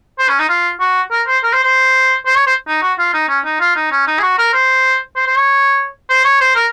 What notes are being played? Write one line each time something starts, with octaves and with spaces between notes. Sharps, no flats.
C5
C#4
D#4
F4
F#4
A#4
C5
A#4
C5
C5
C5
C#5
C5
D#4
F#4
F4
D#4
C#4
D#4
F4
D#4
C#4
D#4
G#4
F#4
A#4
C5
C5
C5
C#5
C5
C#5
C5
A#4